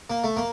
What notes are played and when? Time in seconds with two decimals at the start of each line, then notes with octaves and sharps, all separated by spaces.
0.10 A#3
0.24 A3
0.37 A#3